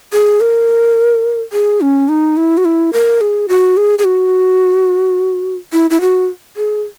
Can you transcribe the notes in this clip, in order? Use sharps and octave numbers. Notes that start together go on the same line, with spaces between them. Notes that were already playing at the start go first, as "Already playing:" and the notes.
G#4
A#4
G#4
C#4
D#4
E4
F#4
E4
A#4
G#4
F#4
G#4
G#4
F#4
E4
E4
F#4
G#4